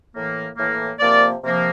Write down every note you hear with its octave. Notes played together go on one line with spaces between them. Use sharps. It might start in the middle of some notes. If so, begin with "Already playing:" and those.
A2 E3 A#3
A2 E3 A#3
C3 F3 A#3 A#4 D5
C3 F3 A#3